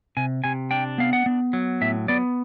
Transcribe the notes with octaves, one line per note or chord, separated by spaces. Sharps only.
C3 G#5
C3 G#5
D4 G5
B3 F5
F#5
B3
F#3
A2 E5
B3 D5